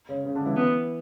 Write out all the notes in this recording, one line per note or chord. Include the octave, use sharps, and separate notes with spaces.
C#3 C#4
C#3 C#4
D3 D4
E3 E4
B3